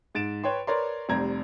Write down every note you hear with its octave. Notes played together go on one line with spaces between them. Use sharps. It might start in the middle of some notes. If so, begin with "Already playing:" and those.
G#2 A6 D7 E7
B4 C#5 G5 C6
A#4 B4 C#5 D5 A#5 C6
F1 G3 C4 A#5 G#6